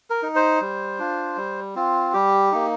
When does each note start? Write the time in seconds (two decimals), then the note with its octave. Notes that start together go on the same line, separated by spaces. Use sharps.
0.10 A#4
0.23 D#4
0.36 C5
0.61 G3
0.99 D4 F4
1.37 G3
1.75 C4 F4
2.13 G3 G4
2.52 A#3 D#4